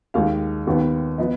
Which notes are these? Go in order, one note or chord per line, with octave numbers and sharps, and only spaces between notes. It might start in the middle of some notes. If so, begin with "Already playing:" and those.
D#2 D#3 G#3 F5
D#2 D#3 B3
F3 B3 D#5